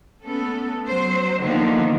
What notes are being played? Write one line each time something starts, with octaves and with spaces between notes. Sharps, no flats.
A3 B3 C#4 A4
F#3 C5
D3 D#3 F3 A#3 B3 D4